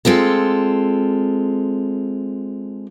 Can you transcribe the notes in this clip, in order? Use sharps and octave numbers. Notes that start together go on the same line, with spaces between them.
G#3 C4 F4 A4